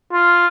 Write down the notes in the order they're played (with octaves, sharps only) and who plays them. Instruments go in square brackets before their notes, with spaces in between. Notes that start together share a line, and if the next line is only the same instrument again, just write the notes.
[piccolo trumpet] F4